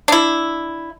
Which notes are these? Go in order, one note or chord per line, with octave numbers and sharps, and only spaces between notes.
D4 E4